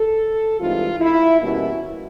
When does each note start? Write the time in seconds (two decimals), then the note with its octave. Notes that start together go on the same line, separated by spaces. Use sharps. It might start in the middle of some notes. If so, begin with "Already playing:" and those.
Already playing: A4
0.60 G2 E3 G#3 C4 D#4 F4
1.01 E4
1.41 E2 B2 G3 A#3 C#4 E4